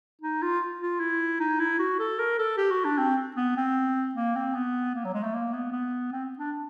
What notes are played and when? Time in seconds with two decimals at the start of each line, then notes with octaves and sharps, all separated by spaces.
0.21 D#4
0.42 F4
0.81 F4
1.00 E4
1.40 D#4
1.60 E4
1.79 F#4
1.99 A4
2.19 A#4
2.38 A4
2.57 G4
2.71 F#4
2.84 D4
2.98 C4
3.36 B3
3.57 C4
4.15 A#3
4.35 C4
4.54 B3
4.95 A#3
5.05 F#3
5.14 G#3
5.24 A3
5.34 A#3
5.53 B3
5.72 B3
6.12 C4
6.39 D4